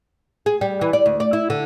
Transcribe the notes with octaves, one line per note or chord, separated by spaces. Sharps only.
G#4
G3
E3
D5
D2
D5
E4
D3